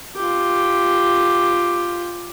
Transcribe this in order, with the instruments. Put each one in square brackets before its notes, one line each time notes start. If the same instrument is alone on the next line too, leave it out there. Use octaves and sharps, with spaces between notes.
[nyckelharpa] F4 G4